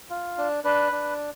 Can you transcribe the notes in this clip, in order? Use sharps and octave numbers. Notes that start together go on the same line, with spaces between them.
F4
D4
D4 B4
D4